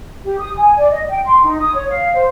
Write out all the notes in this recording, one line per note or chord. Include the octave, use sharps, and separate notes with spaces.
G4
D#6
G#5
D5
D#5
G5
C6
D#4
D#6
C#5
F5
C5